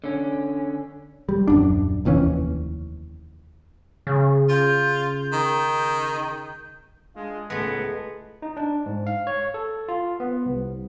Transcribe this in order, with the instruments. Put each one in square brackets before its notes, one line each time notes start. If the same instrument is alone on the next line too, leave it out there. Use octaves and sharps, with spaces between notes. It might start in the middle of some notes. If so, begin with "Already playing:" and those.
[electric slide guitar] D3 C#4
[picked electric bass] G3
D#1 F#2 D4
F1 D#2 E3 C#4
[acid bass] C#3
[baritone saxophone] F4 [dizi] G6
[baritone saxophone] D#3
[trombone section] G#3 D4 F4
[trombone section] C#2 A2 [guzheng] G#3 A3 [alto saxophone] B3
[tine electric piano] D#4
D4
G#2
F5
C#5
A4
F4
B3
C2